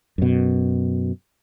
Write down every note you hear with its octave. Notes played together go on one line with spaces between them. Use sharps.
F#2 B2